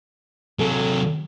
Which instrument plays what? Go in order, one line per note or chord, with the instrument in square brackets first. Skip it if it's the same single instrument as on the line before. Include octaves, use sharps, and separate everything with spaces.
[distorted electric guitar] C3 F#3 [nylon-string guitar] G#4 A4 F5